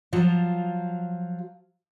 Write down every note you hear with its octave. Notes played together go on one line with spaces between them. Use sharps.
F3 F#3 F4